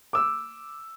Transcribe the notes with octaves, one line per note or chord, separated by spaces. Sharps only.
D6 E6